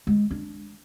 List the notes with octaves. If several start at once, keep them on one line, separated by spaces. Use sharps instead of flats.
G#3
D4